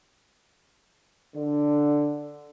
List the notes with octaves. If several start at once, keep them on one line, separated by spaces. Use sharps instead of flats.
D3